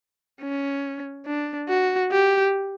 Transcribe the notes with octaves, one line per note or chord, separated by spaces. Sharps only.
C#4
D4
F#4
G4